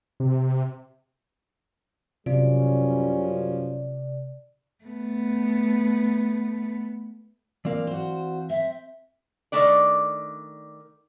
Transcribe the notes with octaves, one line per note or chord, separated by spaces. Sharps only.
C3
F#2 C3 F3 G3 C#4 D5
A3 B3
E3 A#3 C4 D5 F5
F#4 C5
C4 E5
D#3 A3 D4 D5